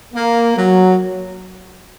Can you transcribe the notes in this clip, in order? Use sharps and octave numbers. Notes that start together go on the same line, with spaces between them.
A#3
F#3